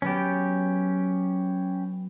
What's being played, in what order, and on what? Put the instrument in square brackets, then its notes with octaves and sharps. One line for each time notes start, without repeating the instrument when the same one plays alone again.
[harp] F#3 B3 [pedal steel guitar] C#4 G4